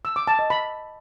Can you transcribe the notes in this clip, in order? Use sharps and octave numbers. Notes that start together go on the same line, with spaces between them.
E6
D6
A5
D#5
B5